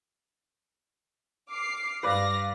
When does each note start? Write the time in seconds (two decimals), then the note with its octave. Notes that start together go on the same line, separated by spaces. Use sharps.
1.50 D6 F6 C7
2.03 G2 B4 D5 F5 A#6